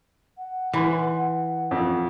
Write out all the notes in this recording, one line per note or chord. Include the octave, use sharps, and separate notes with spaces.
F#5
E3 B4 B5 C6
F2